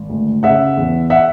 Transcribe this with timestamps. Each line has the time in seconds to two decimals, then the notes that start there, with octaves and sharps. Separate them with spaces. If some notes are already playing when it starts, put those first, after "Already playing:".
Already playing: G#1
0.09 D2
0.43 C#3 E5 F#5
0.77 E2
1.10 E5 F#5